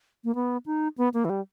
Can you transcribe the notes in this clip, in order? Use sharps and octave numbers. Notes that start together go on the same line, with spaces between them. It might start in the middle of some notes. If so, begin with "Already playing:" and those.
A#3
B3
D#4
B3
A#3
E3
G3